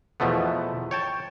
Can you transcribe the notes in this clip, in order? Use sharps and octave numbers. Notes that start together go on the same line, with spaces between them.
E2 B2 F3 A3 B3
C#5 G5 A5